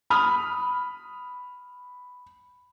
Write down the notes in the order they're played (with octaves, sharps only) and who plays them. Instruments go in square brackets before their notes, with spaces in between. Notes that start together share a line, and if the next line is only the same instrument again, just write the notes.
[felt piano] B5 D#6 F6